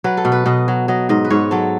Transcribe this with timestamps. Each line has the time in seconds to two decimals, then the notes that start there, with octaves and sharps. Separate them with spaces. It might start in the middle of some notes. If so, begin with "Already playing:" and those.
0.04 F#3 B4
0.17 A4
0.25 B2
0.32 B4
0.46 B2 D#5
0.68 F#3
0.88 F#3 D#5
1.09 G#2 D#5
1.25 B4
1.30 G#2 C#5
1.51 F#3 A4